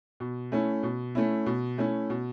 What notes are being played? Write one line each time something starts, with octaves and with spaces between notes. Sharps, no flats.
B2
A3 C#4 E4
B2
A3 C#4 E4
B2
A3 C#4 E4
B2